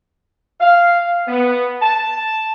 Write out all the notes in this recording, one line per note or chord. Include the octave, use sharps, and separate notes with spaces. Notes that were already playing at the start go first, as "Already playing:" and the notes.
F5
B3
A5